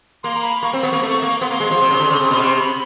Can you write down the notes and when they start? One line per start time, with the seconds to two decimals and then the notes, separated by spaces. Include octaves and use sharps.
0.23 A#3 C6
0.36 A#5
0.43 B5
0.63 A#3 C#6
0.73 C4
0.83 B3
0.92 A#3
1.03 A3
1.22 A#3
1.41 B3 C6
1.50 A#3
1.60 G#3
1.71 F3
1.81 C3
1.91 C#3
1.99 D3
2.10 C#3
2.20 C3
2.30 B2
2.39 C3
2.59 B5